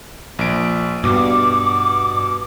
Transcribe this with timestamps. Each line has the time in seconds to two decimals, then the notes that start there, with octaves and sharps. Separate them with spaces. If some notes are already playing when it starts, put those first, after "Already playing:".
0.39 A#1 D7
1.04 G2 B2 D6